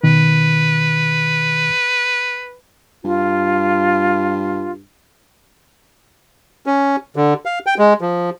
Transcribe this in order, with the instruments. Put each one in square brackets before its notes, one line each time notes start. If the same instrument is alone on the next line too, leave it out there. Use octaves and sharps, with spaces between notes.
[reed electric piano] B2 D#3 [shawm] B4
[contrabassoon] G2 [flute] F4
[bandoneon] C#4
D3
F5
G5
G#3
F3